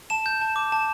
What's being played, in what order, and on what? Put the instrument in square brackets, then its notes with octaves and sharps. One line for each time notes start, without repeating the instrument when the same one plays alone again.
[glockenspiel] A5 E7
G6
A5
D6
A5